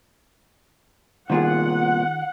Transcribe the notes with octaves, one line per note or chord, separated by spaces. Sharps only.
C2 A#2 D#3 F4 G#4 F#5